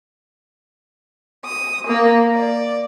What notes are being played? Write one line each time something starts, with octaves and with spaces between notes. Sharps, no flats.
D#6
A#3
D5